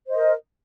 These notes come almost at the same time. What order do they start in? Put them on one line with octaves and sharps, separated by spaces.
C5 D#5 A#4